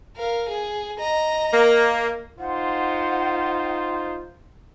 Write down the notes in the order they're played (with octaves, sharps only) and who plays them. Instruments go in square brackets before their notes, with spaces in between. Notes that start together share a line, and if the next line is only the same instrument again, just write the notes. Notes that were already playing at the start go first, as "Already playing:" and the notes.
[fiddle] A#4 F5
G#4
D#5 A#5
[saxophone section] A#3
[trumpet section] D#4 F4 C5 [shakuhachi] F#5